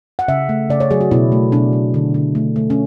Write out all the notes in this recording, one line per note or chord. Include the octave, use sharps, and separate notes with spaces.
F#5
C#3 E5
A3
C#3 D5
C#5
F#3 G#4
F#4
B2 E4
A3
B2 D4
F#3
D3
D3
A3
A3
C#4